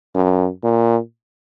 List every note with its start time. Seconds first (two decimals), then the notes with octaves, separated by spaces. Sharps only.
0.15 F#2
0.63 A#2